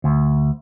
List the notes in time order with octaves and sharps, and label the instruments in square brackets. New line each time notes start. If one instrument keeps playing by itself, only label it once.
[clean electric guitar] D2